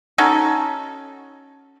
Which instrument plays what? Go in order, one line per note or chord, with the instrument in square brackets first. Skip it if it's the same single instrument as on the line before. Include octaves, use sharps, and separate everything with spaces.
[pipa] C#4 D#4 F#4 A4